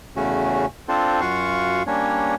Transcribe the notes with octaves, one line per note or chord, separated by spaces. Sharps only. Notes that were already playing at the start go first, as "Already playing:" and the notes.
E2 C#3 A3 C#4 F#4
C4 D4 F4 A4 C5
F#2 F4 F#4 F5 F#5 C#6
G3 A#3 C#4 D4 C#5